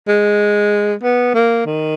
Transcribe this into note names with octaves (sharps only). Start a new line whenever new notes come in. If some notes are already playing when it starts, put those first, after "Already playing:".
G#3
B3
A#3
D#3